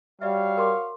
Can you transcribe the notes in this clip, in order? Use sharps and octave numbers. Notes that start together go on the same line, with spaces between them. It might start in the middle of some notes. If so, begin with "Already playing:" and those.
G3 F#4 C#5 D5 E5 F5
A#4 C6 D6